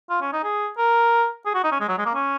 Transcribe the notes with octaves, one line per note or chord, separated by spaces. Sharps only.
F4
C#4
D#4
G#4
A#4
G#4
F#4
D#4
C#4
G#3
F#3
G#3
A#3
C#4